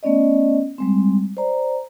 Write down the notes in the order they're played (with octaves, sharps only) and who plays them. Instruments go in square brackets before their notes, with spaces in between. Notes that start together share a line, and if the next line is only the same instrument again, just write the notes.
[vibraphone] A3 B3 C#4 D5 D#5
G3 G#3 C4
C5 D5 A#5